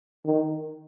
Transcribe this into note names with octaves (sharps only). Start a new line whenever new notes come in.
D#3